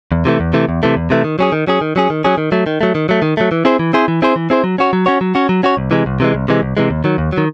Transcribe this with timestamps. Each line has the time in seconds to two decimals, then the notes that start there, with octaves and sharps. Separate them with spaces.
0.12 E2
0.25 C3 E3 A3
0.40 E2
0.53 C3 E3 A3
0.69 E2
0.83 C3 E3 A3
0.96 E2
1.10 C3 E3 A3
1.24 D#3
1.39 F#3 C#4 G#4
1.52 D#3
1.67 F#3 C#4 G#4
1.81 D#3
1.96 F#3 C#4 G#4
2.10 D#3
2.24 F#3 C#4 G#4
2.38 D#3
2.52 F#3 A3
2.66 D#3
2.81 F#3 A3
2.95 D#3
3.09 F#3 A3
3.22 D#3
3.37 F#3 A3
3.52 E3
3.65 C4 E4 G#4 C5
3.79 E3
3.93 C4 E4 G#4 C5
4.08 E3
4.22 C4 E4 G#4 C5
4.36 E3
4.50 C4 E4 G#4 C5
4.64 F#3
4.78 C#4 F#4 C#5
4.93 F#3
5.06 C#4 F#4 C#5
5.21 F#3
5.35 C#4 F#4 C#5
5.49 F#3
5.63 C#4 F#4 C#5
5.77 C2
5.91 C3 E3 G#3
6.06 C2
6.20 C3 E3 G#3
6.34 C2
6.48 C3 E3 G#3
6.62 C2
6.77 C3 E3 G#3
6.90 D#2
7.04 D#3 F#3
7.18 D#2
7.32 F#3
7.38 D#3